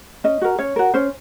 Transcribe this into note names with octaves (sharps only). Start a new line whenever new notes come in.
C#4 D#5
F#4 A#4
C#4 C#5
F#4 A#4
C#4 C5